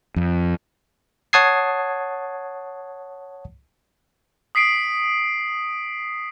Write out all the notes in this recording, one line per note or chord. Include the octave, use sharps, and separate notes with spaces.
F2
C#5 F#5 A5 D#6 G#6 C7
D#6 B6 C7 D7